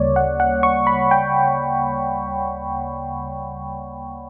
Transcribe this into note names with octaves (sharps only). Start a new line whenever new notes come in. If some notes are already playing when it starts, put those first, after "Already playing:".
Already playing: D2 C#3 G3 A#3 C#5 D5
F#5
F#5
C#6
B5
G5